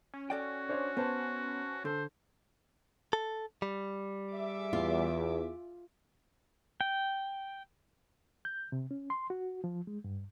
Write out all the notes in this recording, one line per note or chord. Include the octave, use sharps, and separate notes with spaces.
C#4
F#4 A4 D5 G5
D4 C5 C#5
B3 B4 C5 A5
D3 A4 C5
A4
G3
G#4 E5 D6
E2 F4
G5
G6
C3
C#4
C6
F#4
F3
G#3
G2